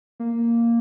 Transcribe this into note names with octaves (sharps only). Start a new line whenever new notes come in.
A#3